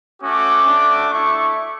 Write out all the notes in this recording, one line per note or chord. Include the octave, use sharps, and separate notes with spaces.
A3 C#4 F#4 D6
A3 D4 F#4
A3 E4 C#6